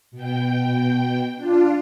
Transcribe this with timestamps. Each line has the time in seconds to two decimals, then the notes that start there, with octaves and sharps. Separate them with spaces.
0.11 B2 G5
1.36 D4 F4